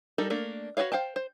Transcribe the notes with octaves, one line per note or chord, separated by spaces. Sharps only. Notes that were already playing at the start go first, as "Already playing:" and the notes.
G3 D#4 A4 A#4
A3 A#3 D4 A#4
F#4 A#4 B4 C#5 F5
C5 F5 G5 A5
C5